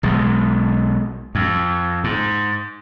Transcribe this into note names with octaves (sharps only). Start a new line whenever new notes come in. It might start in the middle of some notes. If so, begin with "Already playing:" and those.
B1 B2 G#3
F2
G#2